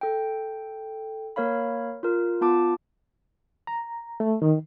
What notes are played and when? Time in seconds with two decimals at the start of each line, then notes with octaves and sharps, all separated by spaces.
0.01 A4 G5
1.36 A#3 A#4 C#5 F5 B5
2.03 F4 A#4
2.41 B3 F4 A5 D6
3.67 A#5
4.20 A3
4.42 D#3